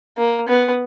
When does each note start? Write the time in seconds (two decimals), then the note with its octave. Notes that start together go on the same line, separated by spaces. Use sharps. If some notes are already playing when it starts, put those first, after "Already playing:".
0.18 A#3
0.48 B3